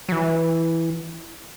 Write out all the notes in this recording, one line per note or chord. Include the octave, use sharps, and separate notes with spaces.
F#3
E3